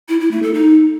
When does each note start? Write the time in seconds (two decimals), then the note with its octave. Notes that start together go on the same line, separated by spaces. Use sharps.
0.09 E4
0.20 E4
0.31 A3
0.43 A4
0.54 D#4